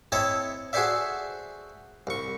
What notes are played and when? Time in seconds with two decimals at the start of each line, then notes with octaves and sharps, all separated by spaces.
0.12 C4 E4 A4 C#5 D#5 A5
0.73 F#4 G#4 A4 C5 D5 E5
2.07 C2 C#6